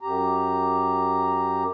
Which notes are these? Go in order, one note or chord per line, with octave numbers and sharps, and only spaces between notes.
F#2 G4 A#5